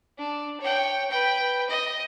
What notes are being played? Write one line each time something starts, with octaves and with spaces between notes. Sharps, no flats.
D4
C#5 G5
B4 G5
D#5